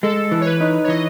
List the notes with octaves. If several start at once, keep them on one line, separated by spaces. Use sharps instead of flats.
G#3 A4
E3
C#5
B4
D#4
C#5
E3 D#5